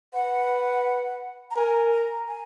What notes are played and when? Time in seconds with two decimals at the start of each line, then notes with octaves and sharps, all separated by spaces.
0.14 B4 F#5
1.51 A#5
1.56 A#4 G#5
1.93 A#5
2.28 G#5